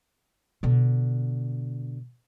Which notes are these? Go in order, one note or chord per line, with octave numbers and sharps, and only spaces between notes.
B2 D3